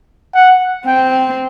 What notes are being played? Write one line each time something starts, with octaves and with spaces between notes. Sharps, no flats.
F#5
C4 G5